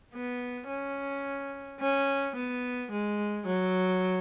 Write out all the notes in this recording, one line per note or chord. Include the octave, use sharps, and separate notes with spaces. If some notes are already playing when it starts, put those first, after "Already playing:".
B3
C#4
C#4
B3
G#3
F#3